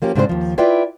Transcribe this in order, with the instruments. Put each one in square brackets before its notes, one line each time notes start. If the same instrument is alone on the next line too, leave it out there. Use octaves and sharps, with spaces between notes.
[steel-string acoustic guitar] F3 A#3 C#4 G4
G#2 C#3 C4 D4 B4 C5
D#2 F3
E4 F4 B4 D5 E5 G5